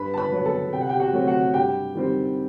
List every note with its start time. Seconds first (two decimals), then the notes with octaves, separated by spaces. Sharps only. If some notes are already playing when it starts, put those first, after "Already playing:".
Already playing: G2 B4 B5
0.14 A5
0.18 B4 B5
0.32 F#3 B3
0.46 A4 A5
0.73 C3 G5
0.81 F#5
0.89 G4 G5
1.00 F#4 F#5
1.13 F#3 A3 C4
1.27 F#4 F#5
1.54 G2 G4 G5
1.95 D#3 G3 C4